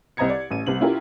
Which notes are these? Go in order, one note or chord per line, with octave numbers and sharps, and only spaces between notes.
C2 C4 D#5 A#5 G#6 C#7
D5
A1 D#7
C2 C3 F#7
C#4 E4 F4 G4 A#4